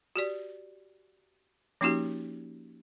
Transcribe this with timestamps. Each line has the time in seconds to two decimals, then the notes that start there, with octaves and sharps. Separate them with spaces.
0.16 F#4 G4 D5
1.81 F3 A#3 C#4 D#4 F#4 G4